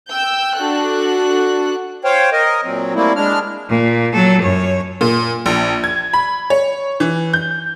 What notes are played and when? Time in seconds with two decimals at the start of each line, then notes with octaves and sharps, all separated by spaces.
0.10 G5 E6 G6
0.56 D4 F#4 A4 F#6
2.04 C5 C#5 F5 G5
2.32 A#4 D#5
2.65 A#2 F#3 C4
2.95 G3 A3 A#3 C4 E4
3.16 G#3 D4 F6
3.69 A#2
4.13 F#3 A4
4.42 F#2 C#5
5.01 A#2
5.46 A#1
5.84 G#6
6.13 B5
6.50 C#5
7.00 E3
7.33 G6